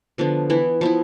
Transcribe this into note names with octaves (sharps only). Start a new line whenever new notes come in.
D3 F3 B3
E3 B3 E4
F3 B3 E4